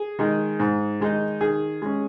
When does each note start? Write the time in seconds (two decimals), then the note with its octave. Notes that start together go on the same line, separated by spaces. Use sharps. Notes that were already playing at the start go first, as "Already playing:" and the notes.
Already playing: G#4
0.19 D#3 G#3 D#4
0.60 G#2
1.00 D#3 G#3 D#4
1.41 D#3 G#4
1.82 G#3 C#4